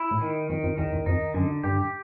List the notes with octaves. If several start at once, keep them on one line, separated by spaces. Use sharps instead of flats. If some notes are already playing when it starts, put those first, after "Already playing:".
Already playing: E4
A2
D#3
F2 D#3
F2
E2 D#3
E2
F2 D#4
F#2 D3
G2 G4